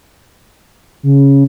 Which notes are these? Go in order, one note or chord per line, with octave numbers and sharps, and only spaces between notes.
C#3